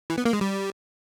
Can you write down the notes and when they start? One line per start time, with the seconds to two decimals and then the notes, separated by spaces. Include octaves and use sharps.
0.10 E3
0.18 B3
0.25 A#3
0.33 G#3
0.41 G3